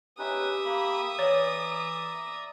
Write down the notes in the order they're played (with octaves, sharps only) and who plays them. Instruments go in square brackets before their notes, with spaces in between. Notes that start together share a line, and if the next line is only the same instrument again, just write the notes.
[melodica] C#4 D#4 B4 [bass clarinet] G4 [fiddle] E5 D#6
[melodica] A#3 B5
[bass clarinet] E3 [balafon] C#5 [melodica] D5 A#5